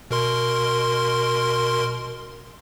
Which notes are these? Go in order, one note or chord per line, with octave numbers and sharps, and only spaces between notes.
B2 A#4 C6